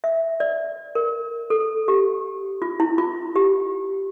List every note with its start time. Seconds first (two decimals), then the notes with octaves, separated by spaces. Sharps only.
0.04 E5
0.40 D5
0.95 A#4
1.50 A4
1.88 G4
2.62 F4
2.80 E4
2.98 F4
3.36 G4